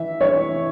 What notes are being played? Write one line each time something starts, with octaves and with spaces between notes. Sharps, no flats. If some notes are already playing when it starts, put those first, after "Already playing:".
Already playing: E3 E5
E3 C#5